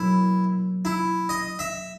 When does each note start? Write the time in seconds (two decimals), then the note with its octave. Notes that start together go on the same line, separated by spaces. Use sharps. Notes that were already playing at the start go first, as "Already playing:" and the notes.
Already playing: B2 F#3 A#3 E4
0.85 E4
1.29 D#5
1.59 E5